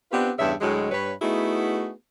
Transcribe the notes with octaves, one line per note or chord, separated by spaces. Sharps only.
B3 C4 D4 F4 G4 B4
E2 G2 C#3 E5
D2 A2 F#3 G#3
G2 B4 C#5
A3 B3 D#4 E4 F#4 G#4